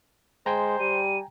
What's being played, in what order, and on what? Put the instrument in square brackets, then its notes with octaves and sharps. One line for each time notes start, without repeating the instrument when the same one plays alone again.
[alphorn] G#3 [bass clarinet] C5 [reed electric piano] G5 G#5 A#5
[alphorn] G3 [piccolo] D#7